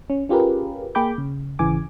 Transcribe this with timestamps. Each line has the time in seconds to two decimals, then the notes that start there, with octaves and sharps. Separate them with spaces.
0.10 C#4
0.29 C#4 F4 G4 G#4 A#4 B4
0.95 A#3 G#4 G5 B5 D6 G6
1.18 C#3
1.59 G#1 C#3 E3 G#5 D6